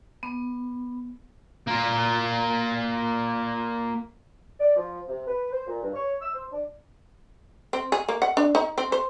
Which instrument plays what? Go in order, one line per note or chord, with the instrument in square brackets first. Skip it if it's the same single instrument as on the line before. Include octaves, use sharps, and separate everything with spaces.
[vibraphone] B3
[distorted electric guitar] A#3 F4
[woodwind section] D5
F3
C3
B4
C5
A#2
G2
C#5
E6
C5
D4
[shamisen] C4
G#4
A#3
F#5
D4
D#4
C4
C5